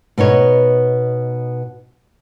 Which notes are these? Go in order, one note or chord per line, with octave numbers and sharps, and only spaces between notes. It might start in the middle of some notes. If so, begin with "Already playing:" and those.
B2 B3 D#4 C#5